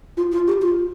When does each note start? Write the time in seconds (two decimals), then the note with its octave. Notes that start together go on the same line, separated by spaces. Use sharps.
0.17 F4
0.32 F4
0.47 G4
0.62 F4